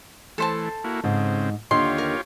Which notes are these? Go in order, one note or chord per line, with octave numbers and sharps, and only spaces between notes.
E3 A3 A4 C5 A5
A#3 E4 F#4
G#2 C#3 C4
D#2 D3 F4 G4 C#5 D#5 C6
A#4